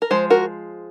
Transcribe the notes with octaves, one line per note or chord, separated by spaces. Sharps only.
A#4
F3 G#3 C5
F#4 A#4